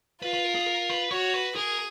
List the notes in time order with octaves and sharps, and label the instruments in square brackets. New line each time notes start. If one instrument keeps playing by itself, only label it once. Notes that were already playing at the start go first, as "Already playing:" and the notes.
[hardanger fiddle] F4 [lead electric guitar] B4
[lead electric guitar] B4
A#4
G#4
A#4
B4
[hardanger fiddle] F#4 [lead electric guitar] C#5
[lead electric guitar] B4
[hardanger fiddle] G#4 [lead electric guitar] A#4